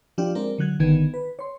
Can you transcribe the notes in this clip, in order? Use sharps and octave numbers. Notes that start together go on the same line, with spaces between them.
F3 D4 F4 G4 D5
G#3 C4 A#4 D5
D3 F#3 F#6 G#6
G#1 D3 D#3 B3 G#6
B4
C#5 C6